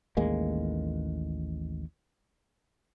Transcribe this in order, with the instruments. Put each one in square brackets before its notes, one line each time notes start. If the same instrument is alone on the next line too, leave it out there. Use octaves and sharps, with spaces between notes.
[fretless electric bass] A1 D#2 G#3 A#3